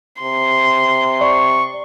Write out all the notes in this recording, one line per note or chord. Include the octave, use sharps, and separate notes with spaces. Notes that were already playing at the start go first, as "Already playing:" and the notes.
C3 C6
D5 C#6